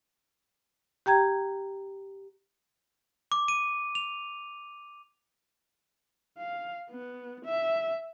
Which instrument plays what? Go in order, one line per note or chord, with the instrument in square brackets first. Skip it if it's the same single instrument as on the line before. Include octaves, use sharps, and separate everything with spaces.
[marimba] G4 G5 A#5 G#6
[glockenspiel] D6
D#7
F7
[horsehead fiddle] F5
B3
E5